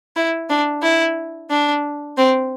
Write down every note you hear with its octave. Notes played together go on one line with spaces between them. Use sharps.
E4
D4
E4
D4
C4